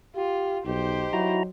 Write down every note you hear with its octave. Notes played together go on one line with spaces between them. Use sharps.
F4 G4
B1 D#4 G4 C5
F#3 E4 F#4 A#5